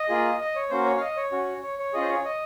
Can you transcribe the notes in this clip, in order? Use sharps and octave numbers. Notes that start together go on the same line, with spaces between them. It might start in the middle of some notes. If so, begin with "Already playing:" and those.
Already playing: D#5
A#3 F4 G#4
D#5
C#5
A#3 C#4 F#4 C5
C#5
F5
D#5
C#5
C#4 F#4
C#5
C#5
C#4 F4 G#4 D#5
C5
C#5
D#5